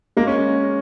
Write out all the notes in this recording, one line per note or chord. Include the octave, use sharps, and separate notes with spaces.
G#3 A#3
C#4